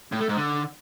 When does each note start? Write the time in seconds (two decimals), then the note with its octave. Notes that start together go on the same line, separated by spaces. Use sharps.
0.12 A2
0.20 A3
0.29 G#2
0.37 D3